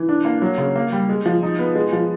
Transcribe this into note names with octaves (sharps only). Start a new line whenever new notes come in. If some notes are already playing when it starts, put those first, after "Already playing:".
Already playing: E3
D4
A#3
F#3
C#3
A#3
G3
G#3
F3
D#4
B3
G#3
F3